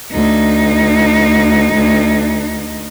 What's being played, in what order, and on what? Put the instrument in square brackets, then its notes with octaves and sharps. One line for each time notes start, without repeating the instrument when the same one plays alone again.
[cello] D2 D#4